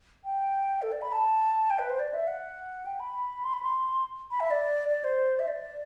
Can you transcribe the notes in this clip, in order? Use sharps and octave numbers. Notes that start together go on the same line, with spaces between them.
G5
A4
D5
B5
A5
G5
B4
C5
D5
E5
F#5
G5
B5
C6
B5
C6
B5
E5
D5
D5
C5
E5
D5